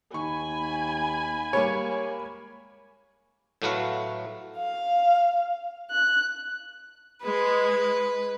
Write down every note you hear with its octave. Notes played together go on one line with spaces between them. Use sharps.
D#2 G#5 B5 C#6
G3 G#3 A#3 C#5
A2 F#3 A3 F#4 B4 F5
F5
F#6
G#3 B4